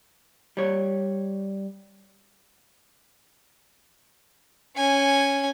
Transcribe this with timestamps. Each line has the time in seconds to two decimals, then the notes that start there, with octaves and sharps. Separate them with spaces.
0.57 G3 C#5
4.77 C#4 G#5